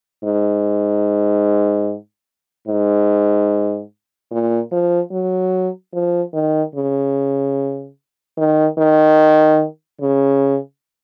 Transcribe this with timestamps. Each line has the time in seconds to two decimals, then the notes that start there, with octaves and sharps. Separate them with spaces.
0.24 G#2
2.67 G#2
4.31 A#2
4.72 F3
5.11 F#3
5.94 F3
6.34 D#3
6.75 C#3
8.38 D#3
8.78 D#3
10.01 C#3